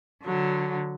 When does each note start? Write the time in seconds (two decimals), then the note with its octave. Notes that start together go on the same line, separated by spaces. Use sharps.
0.23 D3 F#3